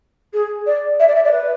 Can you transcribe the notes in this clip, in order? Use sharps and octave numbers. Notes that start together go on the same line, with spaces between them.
G#4
D5
E5
D5
E5
D5
B4